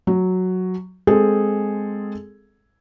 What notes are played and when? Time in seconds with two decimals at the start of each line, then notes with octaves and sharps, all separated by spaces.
0.07 F#3
1.07 G#3 C4 G#4 A4